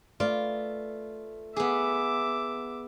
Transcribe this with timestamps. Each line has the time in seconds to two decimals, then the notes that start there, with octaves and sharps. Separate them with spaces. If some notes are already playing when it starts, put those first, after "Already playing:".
0.20 A3 F4 B4 D5
1.56 B3 G#4 E5 D6